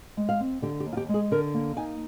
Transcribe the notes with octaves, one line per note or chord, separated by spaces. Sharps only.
G#3
F5
C4
D3 G4
G4
D#2
F4
G4
G#3
G#4
D3 A#4
A#3
D#4 G#5